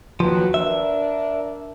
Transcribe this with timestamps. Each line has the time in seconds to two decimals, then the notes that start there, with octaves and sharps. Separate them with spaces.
0.20 D#2 F3 F#3 B4
0.54 D4 A#4 E5